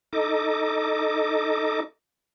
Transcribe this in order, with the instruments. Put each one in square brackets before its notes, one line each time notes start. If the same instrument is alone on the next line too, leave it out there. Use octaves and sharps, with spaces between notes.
[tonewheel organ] D#4 A4 D#5 D6